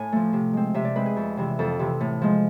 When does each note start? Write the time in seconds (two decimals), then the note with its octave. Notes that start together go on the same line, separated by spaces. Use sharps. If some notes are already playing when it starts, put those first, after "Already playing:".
Already playing: A2 G#5
0.12 F3 A3
0.33 C3
0.53 G#3 C4
0.74 C3 E5
0.85 D5
0.96 G#3 C4 B4
1.06 G#4
1.17 F2
1.37 C3 E3
1.59 F2 A4
1.79 C3 E3
2.00 A2
2.21 F3 G#3